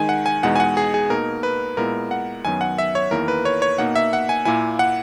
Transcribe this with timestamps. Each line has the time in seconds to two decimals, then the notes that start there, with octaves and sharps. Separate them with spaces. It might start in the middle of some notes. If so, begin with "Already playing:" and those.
Already playing: D#3 G#3 D#4 G#5
0.09 F#5
0.26 G#5
0.43 E2 B2 G#3 D#4 F#5
0.56 G#5
0.60 F#5
0.77 G#4
0.94 G#4
1.10 B2 A#3 D#4 A#4
1.43 B4
1.77 A#2 G#3 B3 E4 A#4
2.11 F#5
2.45 F#2 D#3 F#3 B3 G#5
2.61 F#5
2.78 E5
2.95 C#5
3.11 E2 D#3 A#3 E4 A#4
3.28 B4
3.45 C#5
3.62 C#5
3.78 B2 A#3 D#4 F#5
3.96 E5
4.13 F#5
4.29 G#5
4.45 A#2 A#3 E4 G#5
4.79 F#5